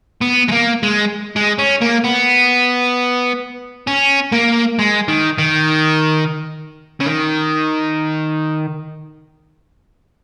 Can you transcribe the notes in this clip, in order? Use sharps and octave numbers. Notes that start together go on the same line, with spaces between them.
B3
G#3
A#3
G#3
G#3
C#4
A#3
B3
C#4
A#3
G#3
D#3
D#3
C#3
D#3